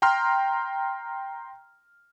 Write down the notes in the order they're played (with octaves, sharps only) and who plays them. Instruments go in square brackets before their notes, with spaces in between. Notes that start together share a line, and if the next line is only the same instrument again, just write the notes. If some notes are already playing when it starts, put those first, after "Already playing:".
[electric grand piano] G5 A#5 C6 F6